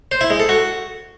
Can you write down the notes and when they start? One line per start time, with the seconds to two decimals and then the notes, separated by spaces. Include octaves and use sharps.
0.12 C5
0.21 E4
0.30 G#3
0.40 A4
0.49 F#4